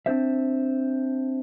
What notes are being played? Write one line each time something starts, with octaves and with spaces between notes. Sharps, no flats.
C4 D4 C5 E5